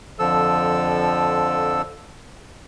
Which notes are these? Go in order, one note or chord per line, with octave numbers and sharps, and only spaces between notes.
F2 D3 F3 A4 E6